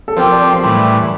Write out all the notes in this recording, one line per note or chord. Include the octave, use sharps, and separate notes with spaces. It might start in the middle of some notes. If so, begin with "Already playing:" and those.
A4
F3 C4 G4 A#4
D5
C6
A2 E3 G3